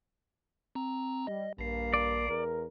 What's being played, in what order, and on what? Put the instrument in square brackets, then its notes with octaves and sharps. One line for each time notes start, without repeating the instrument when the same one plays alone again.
[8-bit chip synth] C4 A#5
[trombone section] G3 [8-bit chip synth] D#5
[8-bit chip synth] A#1 C7 [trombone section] G2 A#3
[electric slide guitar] D5
[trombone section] E2 A#4